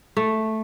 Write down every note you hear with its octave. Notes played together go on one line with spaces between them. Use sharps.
A3